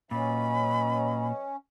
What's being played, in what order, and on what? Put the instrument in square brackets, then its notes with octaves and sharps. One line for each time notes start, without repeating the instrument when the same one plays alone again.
[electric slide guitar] A#2 [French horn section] F#3 B4 D#5 [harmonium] C#4 [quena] B5